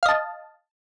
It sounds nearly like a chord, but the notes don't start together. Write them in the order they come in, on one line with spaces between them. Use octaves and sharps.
F5 D#5 A5